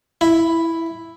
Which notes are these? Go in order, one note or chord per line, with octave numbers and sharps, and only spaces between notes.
E4